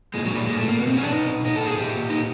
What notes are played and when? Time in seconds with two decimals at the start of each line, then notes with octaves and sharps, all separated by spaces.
0.14 A#2 G#3
0.25 F#3
0.30 A#2
0.36 G3
0.46 A#2 G#3
0.57 A3
0.63 A#2 A#3
0.79 B2 B3
0.87 C4
0.95 B2 C#4
1.03 D4
1.11 B2 D#4
1.28 B2
1.44 A#2 D#4
1.56 A#2 A4
1.66 G#4
1.77 A#2 G4
1.94 A#2
2.10 A#2 D#4